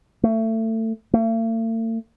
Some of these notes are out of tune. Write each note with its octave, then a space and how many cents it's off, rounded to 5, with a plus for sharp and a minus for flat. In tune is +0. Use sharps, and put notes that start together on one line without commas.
A3 +25
A3 +45